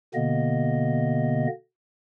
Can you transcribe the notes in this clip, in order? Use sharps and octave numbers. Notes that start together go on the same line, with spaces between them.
B2 D3 A#3 B3 D#5